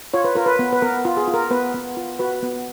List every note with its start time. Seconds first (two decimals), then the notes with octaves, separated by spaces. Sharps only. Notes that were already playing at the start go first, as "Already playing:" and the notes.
0.14 F4 C#5
0.24 B4
0.35 F4 A#4
0.46 B4
0.59 B3
0.73 B4
0.82 B3 A#4
1.05 F4
1.17 G#4
1.28 F4
1.34 A#4
1.51 B3 B4
1.74 B3
1.97 F4
2.19 F#4 B4
2.43 B3